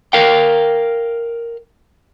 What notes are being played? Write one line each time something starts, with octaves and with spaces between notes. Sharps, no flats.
A#4 F5 G5